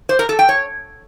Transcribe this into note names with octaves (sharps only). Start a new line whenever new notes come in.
C5
A#4
A4
G5
C#5